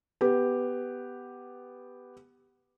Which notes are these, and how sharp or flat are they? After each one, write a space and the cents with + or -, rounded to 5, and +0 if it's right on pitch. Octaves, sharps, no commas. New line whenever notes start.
B3 +5 G4 +5